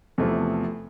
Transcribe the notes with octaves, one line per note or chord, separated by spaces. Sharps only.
E2 C3 F3 A3